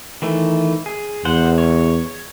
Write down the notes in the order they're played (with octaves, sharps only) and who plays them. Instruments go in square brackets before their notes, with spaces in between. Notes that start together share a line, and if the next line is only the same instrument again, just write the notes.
[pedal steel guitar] D#3 E3 A3
G#4
[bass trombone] E2 [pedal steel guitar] C5 F#5
[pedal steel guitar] C#5